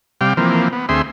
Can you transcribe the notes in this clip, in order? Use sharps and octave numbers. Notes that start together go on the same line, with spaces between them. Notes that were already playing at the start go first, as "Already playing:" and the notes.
C3 G3 F5 G5
E3 F3 A#3 C4
B3
D2 C4 G#4 E5 C6